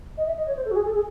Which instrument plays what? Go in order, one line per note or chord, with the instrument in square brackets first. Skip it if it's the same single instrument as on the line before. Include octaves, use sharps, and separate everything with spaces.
[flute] D#5
E5
D#5
C#5
C5
A4
F#4
G#4
A4
G#4